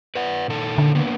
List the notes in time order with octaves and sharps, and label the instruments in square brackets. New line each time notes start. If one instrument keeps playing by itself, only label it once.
[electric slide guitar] B4 D5 F#5
A#2 D#3 A4
[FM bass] D3
[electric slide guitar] A#3 B3 D4